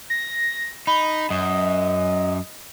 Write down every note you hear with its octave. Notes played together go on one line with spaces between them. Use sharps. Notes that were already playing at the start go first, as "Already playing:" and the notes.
A#6
D#4 B5
F#2 D#5